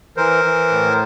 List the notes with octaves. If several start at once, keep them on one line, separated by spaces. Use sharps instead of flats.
E3 A#4 C5
E3
A2